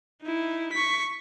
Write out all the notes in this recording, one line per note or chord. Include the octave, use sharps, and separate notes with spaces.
D#4 E4
C#6 B6